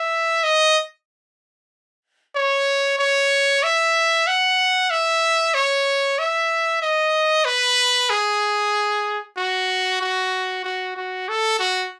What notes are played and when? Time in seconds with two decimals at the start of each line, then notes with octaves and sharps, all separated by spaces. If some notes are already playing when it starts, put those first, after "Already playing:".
Already playing: E5
0.43 D#5
2.35 C#5
2.99 C#5
3.63 E5
4.27 F#5
4.91 E5
5.54 C#5
6.19 E5
6.82 D#5
7.45 B4
8.10 G#4
9.37 F#4
10.01 F#4
10.64 F#4
10.96 F#4
11.28 A4
11.59 F#4